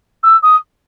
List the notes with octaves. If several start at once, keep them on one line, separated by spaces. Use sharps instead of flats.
E6
D#6